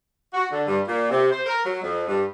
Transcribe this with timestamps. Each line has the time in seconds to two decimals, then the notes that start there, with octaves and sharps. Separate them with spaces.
0.34 F#4
0.51 D3
0.67 G2
0.87 A#2
1.10 C3
1.32 C5
1.46 A#4
1.65 F#3
1.82 F2
2.08 G2